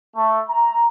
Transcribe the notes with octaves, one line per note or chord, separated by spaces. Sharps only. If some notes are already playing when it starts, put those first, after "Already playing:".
A3
A#5